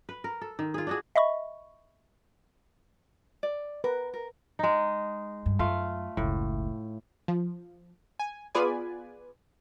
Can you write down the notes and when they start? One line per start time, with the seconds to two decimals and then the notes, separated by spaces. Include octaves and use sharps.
0.09 B4
0.24 A#4
0.41 A4
0.59 D#3
0.74 F4 G#4
0.87 D4 F#4 G#4
1.16 D#5 E5 B5 C#6
3.43 D5
3.84 A#4 B4
4.14 A#4
4.59 G#3 D#4
5.46 G2
5.59 F#2 A3 F4 F5
6.17 F#1 C#2 A2
7.28 F3
8.19 G#5
8.55 B3 F4 G#4 B4 D5 G#5